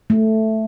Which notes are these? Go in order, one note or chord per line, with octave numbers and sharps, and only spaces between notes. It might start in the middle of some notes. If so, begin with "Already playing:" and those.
A3